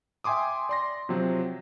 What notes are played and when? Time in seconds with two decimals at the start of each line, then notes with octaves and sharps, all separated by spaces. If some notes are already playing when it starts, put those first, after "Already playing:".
0.24 E5 G5 G#5 C6 D6 D#6
0.69 D5 C6 A#6
1.09 C3 F3 F#3 C4